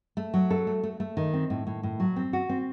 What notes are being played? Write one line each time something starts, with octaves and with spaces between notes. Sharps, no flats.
A3
F#3
A4
A3
A3
A3
D#3
C4
A2
A2
A2
F#3
C4
F#4
C4